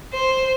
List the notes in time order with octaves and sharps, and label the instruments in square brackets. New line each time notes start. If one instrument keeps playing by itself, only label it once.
[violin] C5